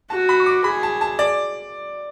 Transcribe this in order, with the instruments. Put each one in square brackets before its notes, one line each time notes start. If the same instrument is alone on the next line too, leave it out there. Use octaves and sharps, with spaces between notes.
[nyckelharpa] F#4 [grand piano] A5
[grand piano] B5
C#6
D6
[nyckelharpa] G#4 [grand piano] B5
[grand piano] A5
A5
D5